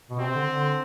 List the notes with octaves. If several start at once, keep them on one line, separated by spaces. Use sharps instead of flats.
B2
C3 C4
D3
D3